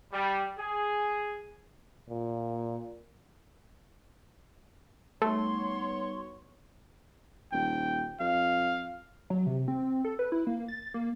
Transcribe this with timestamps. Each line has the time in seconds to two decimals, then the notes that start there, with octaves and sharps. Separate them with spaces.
0.12 G3
0.57 G#4
2.09 A#2
5.22 G3 A3 B3 D#4 F#4 C#5 C6
7.53 D#1 G5
8.20 F2 F5
9.30 F#3
9.46 C3
9.68 C4
10.05 A4
10.19 B4
10.32 E4
10.47 A#3
10.68 A6
10.94 A#3